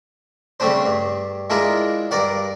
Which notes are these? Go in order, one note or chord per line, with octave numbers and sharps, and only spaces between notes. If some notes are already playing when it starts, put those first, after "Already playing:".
C#3 G3 A3 C4 D4 C5
G2
G#3 D4 E4 F4 A#4
G2 A#4 D5 F#5